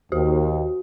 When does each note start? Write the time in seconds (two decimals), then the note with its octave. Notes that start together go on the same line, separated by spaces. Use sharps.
0.12 D#2 F#4